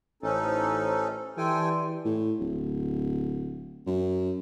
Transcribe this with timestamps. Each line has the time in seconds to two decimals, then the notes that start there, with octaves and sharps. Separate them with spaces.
0.23 A1 C#4 D#4 A4 C5
1.37 E3 G4 A4 D5 G5 G#5 C6
2.05 A2
2.39 D1
3.86 F#2